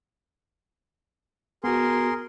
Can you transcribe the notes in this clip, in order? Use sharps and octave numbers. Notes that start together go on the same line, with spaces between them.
B3 F#4 G#4 A#4 C6